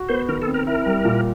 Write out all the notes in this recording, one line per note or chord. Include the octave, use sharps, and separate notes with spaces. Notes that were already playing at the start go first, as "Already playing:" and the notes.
Already playing: F#4
B3 C5
D#3 A#4
A4
C4
A#4
E4 A#4
G3
A#2